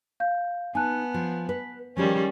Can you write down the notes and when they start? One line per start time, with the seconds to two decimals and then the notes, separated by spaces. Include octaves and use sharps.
0.20 F5 G6
0.75 B3 D#4 G#5 A5 F#6
1.14 F3
1.49 B4
1.97 D#3 F3 G3 C#4 G4 G#4